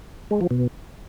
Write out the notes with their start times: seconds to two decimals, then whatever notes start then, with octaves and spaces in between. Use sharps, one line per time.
0.31 G#3
0.41 F3
0.51 B2